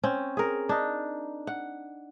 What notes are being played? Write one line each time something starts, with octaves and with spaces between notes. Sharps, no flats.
C4 C#4
G#4 A#4
D4 D#4
F#5